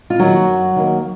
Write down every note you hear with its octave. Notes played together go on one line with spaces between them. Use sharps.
F4
D#3 F#3 G3 A#3 F#4
F#2
D#3 G3 A#3